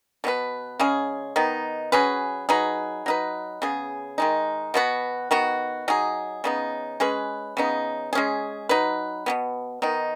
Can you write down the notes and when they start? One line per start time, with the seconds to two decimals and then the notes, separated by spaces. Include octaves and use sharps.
0.24 B2 B3 D#4 B4
0.80 C#3 G#3 C#4 G#4
1.36 D#3 B3 D#4
1.92 F#3 C#4 G#4 B4
2.49 F#3 D#4 G#4 B4
3.06 F#3 D#4 B4
3.62 C#3 B3 G#4
4.18 D#3 G#3 D#4
4.74 B2 B3 F#4 B4
5.31 D#3 B3 F#4
5.88 F#3 D#4 G#4
6.44 C#3 B3 D#4
7.00 G#3 C#4 G#4 B4
7.57 C#3 B3 D#4
8.13 G#3 C#4 G#4
8.69 F#3 D#4 B4
9.26 B2 F#3 B3
9.82 D#3 B3 D#4